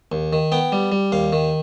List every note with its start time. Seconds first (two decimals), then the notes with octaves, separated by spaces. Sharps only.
0.12 D#2
0.33 D#3
0.52 B3 G5
0.72 G3
0.92 G3
1.12 D#2 F5
1.33 D#3